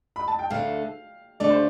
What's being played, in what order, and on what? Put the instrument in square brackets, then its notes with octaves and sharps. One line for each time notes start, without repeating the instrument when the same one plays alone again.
[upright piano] B5
A5
G5
[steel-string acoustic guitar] D2 D3 A3 [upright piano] F5
[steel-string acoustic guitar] D2 D3 A3 [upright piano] D5
[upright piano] C5